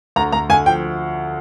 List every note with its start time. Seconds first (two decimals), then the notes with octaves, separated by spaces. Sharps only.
0.16 D2 A#5
0.32 D2 A#5
0.50 D2 G#5
0.66 F3 G5